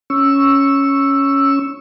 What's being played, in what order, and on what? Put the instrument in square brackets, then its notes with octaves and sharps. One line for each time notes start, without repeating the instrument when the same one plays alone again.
[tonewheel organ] C#4 C#6 E6